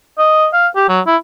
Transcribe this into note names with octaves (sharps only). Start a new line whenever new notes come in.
D#5
F5
G4
F#3
E4